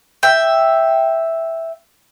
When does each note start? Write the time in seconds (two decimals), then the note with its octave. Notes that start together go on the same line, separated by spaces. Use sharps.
0.23 E5 G5